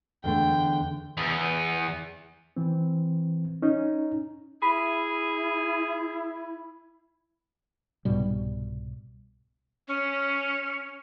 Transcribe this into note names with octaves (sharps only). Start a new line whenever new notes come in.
E2 D3 A3 G5
E2
E3 C4
C#4 D#4
E4 G#4 B5
C2 G#2 B2 G3
C#4